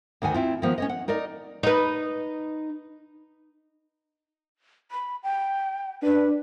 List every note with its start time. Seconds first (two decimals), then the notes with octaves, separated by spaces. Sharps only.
0.22 D2 D#3 F#5 G#5
0.34 C4 E4 F4
0.62 D#3 F3 B3
0.78 C#4 C#5 D#5
0.89 F#5
1.08 D#4 A#4 D5 D#5
1.63 D#4 B4
4.91 B5
5.23 G5
6.03 D4 B4